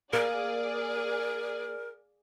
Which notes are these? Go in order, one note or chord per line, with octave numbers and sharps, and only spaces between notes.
A#3 G#4 A#4 D5